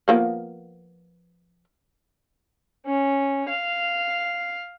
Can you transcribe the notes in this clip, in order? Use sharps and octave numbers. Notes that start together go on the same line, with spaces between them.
F3 A#3 B3
C#4
F5